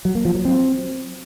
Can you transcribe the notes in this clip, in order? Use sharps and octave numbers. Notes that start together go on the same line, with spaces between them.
F#3
A#3
F3
F#3
C4